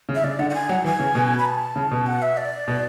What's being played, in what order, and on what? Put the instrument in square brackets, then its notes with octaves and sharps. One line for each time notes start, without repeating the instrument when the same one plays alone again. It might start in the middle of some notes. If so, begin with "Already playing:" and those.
[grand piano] C#3
[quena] E5
[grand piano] C#3 [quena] D5
[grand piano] D3 [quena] F#5
[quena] F#5
G#5
[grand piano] F#3 [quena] F#5
[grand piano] E3 [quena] G#5
[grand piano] C#3
B2
[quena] B5
A5
[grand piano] C#3
B2
[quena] F#5
E5
D5
[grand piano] B2